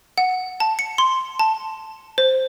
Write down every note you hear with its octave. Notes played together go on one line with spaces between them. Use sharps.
F#5
A5
C#7
C6
A5
C5